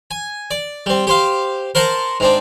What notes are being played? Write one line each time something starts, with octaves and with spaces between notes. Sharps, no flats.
G#5
D5
G3 C4
G4 C5 F5
A#4 C5 F#5 A5 A#5
G#2 C4 D4